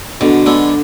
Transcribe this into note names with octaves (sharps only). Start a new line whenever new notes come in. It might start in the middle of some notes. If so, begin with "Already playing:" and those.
B2 D3
G#3 B3 D4 A4